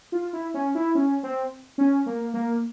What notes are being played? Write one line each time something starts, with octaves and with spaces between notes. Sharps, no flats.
F4
E4
C#4
E4
C#4
C4
C#4
A#3
A#3